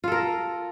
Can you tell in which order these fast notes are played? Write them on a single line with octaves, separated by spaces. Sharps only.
F4 A4 A#4